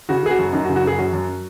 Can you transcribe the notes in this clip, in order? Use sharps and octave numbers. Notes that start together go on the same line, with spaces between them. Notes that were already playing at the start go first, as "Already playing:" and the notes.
C#3 F#4
C#3 G#4
F#4
F#2
F#2 D#4
F#4
C#3
F#4
F#2 G#4
F#2 F#4
F#2